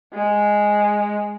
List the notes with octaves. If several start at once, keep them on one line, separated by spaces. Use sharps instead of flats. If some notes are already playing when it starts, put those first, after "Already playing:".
G#3